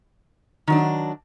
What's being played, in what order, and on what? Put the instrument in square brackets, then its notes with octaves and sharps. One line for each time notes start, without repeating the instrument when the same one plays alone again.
[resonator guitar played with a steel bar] D#3 F#3 D4